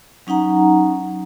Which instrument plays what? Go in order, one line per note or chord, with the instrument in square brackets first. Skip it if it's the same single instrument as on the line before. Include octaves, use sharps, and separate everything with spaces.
[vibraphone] F#3 C#4 D#4 F#5 A#5